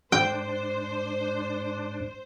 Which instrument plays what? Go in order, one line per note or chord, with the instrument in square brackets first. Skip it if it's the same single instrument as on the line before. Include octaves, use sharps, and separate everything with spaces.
[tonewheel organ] G#2 D4 [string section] C5 [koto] G5